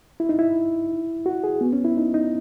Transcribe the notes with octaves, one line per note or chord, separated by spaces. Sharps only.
E4
D#4
E4
F#4
G#4
B3
C#4
E4
D#4
D#4